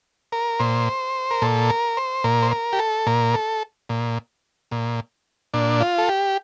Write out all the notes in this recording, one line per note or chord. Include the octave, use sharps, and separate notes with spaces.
A#4
A#2 C5
A#4
A#2 A4
A#4
C5
A#2 A#4
C5
A#4
G4
A4
A#2 A#4
A4
A#2
A#2
A#2 D4
F4
A4
G4